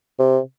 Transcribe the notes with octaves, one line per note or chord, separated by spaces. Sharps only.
C3